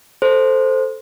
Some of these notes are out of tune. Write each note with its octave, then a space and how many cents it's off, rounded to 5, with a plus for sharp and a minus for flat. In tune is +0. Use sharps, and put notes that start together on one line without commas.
A4 +0 C5 +0